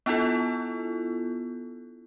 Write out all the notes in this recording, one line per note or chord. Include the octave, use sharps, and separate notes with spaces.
B3 D4 E4 F4 A4